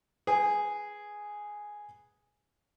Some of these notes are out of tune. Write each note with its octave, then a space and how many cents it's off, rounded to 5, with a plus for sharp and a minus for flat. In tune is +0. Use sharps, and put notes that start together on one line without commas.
G#4 +0 B4 +0 G5 +45